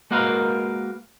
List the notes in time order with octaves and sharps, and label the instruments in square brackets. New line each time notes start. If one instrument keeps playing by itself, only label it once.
[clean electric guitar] G#3 A#3 F#4 A#4 B4 F5